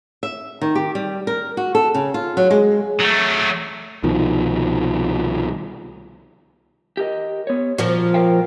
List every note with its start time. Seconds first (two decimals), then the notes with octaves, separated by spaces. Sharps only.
0.23 E5
0.61 D#3
0.75 G4
0.95 G3
1.27 A#4
1.57 F#4
1.75 A4
1.95 C#3
2.14 F4
2.37 F#3
2.51 G#3
3.00 F#3 A3
4.03 C2 B2 D#3 F3
6.97 G4 A#4 D#5
7.47 B3 C#5
7.78 A#2 F3 F#4
8.14 A#4 F5 G5